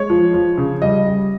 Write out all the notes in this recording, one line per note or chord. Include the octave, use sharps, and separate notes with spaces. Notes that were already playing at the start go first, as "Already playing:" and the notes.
Already playing: G#3 C#5
F3
F3
C#3
G3 D#5
G3